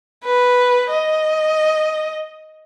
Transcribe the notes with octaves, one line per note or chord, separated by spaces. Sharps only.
B4
D#5